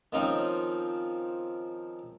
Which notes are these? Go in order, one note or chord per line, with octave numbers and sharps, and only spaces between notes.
D#3 F3 C4 C#4 D#4